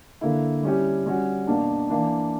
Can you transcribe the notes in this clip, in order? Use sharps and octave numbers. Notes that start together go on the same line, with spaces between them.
D3 A#3 E4
G3 C#4 E4 G4
G3 C#4 F#4
B2 A#3 D4
E3 A#3 D4